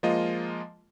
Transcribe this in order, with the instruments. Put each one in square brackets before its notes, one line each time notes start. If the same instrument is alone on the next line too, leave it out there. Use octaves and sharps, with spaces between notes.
[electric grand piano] F3 G#3 A#3 F4 D#5